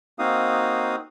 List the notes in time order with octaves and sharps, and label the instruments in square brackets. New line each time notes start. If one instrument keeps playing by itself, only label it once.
[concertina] A#3 C4 D#4 F#4 F5 D#6